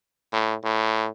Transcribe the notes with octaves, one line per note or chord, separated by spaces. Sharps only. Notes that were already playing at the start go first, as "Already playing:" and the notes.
A2
A2